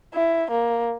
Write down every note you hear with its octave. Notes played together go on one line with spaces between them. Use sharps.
E4
A#3